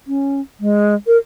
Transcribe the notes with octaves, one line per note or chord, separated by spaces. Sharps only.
C#4
G#3
A#4